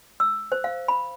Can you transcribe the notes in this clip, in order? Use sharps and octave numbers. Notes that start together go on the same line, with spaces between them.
E6
C5
F5
B5